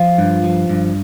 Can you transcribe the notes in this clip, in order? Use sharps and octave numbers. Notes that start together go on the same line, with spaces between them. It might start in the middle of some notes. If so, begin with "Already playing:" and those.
Already playing: F3 F4
G2
F3
G2